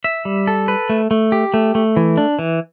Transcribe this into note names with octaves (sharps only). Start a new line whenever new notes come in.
E5
G3
A4
B4
A3
A3
G4
A3
A3
E3
D4
E3